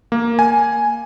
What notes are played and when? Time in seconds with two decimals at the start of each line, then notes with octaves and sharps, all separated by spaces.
0.12 A#3
0.39 G#5